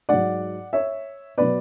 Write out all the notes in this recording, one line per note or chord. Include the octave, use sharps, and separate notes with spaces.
G#2 F#3 D5 F#5
C#5 E5
B2 F#3 B4 D5